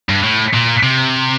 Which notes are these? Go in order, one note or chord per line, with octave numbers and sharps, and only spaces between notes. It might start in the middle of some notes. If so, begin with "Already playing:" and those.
G2
A2
A#2
C3